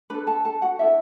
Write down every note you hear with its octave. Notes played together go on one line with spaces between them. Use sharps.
D4 A4 B4 B5
A4 A5
A4 A5
F#4 F#5
D4 E4 A4 E5